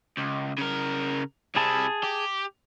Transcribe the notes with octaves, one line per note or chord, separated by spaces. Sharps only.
C#2
C#3 A#4
C3 E4 G#4 A5
G4